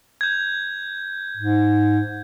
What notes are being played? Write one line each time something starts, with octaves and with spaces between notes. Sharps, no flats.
G6 G#6
G#2